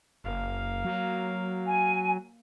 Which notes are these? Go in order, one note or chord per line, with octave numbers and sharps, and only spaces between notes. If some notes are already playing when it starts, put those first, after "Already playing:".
F#1 A#3 F5
F#3
G#5